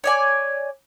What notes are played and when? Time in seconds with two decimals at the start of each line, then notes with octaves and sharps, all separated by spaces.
0.04 C#5 D5 G#5